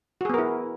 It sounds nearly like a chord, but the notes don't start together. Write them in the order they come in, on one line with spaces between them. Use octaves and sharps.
F#4 G#4 B3 A#4 E4